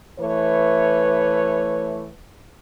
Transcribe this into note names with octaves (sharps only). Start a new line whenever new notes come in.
E3 A3 B4 C#5